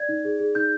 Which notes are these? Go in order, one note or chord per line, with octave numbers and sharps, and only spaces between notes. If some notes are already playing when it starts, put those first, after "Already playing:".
Already playing: D5 G#6
D#4
G#4
G#4
D#4 G6